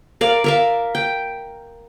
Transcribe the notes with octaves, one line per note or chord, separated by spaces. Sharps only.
A#4 D5 F5
A#4 E5 F5
G5